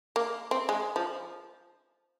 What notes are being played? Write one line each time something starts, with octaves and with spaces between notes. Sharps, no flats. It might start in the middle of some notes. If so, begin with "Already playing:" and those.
A#3
C4
G#3
F3